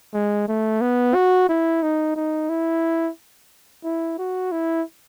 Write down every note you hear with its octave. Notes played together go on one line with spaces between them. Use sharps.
G#3
A3
B3
F#4
E4
D#4
D#4
E4
E4
F#4
E4